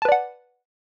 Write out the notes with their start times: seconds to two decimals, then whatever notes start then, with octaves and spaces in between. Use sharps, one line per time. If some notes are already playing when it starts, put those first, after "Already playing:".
0.02 A5
0.05 B4
0.09 D5
0.12 F#5